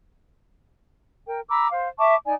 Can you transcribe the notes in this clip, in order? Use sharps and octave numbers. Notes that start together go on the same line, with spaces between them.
A#4 G5
A#5 B5 D6 E6
C5 F5
E5 A5 C#6 D6
D#4 D5 G#5